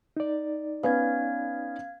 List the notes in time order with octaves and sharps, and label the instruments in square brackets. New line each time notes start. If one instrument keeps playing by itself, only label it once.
[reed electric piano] D#4 D5
[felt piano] B3 C#4 B4 [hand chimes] F5 G#6